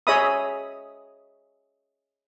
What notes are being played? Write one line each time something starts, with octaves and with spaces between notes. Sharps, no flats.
G#4 C#5 D#5 E5 B5 D#6